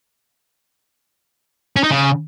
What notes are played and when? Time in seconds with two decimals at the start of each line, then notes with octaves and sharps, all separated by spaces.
1.76 C#4
1.83 D#4
1.91 C#3